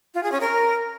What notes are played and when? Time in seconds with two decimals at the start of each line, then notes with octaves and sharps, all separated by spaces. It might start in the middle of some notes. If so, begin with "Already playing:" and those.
0.15 F4
0.23 G#4
0.32 C#4
0.41 A#4